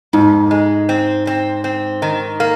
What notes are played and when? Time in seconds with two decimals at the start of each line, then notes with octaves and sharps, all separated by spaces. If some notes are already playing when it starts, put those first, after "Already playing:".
0.13 F2 G#2
0.51 G#3
0.89 C4
1.27 C4
1.64 C4
2.02 D#3
2.40 A#3